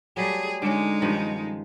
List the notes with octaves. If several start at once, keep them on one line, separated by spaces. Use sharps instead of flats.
F#3 G3 A3 G#4
D3 G#3 C#4 D#4
G2 D#3 F3